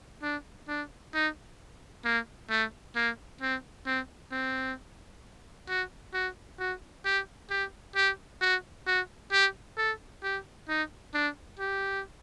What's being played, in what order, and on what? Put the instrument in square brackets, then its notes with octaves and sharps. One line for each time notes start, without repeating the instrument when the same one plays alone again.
[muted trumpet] D4
D4
D#4
A#3
A3
A#3
C4
C4
C4
F#4
F#4
F#4
G4
G4
G4
F#4
F#4
G4
A4
G4
D#4
D4
G4